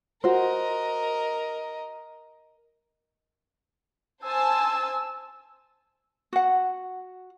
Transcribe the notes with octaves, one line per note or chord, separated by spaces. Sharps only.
F#4 A#4 C5 D#5
C5 G#5 A5 E6
F#4 F#5